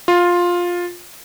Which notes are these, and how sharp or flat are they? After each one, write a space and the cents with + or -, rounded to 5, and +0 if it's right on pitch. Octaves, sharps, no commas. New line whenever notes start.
F4 +10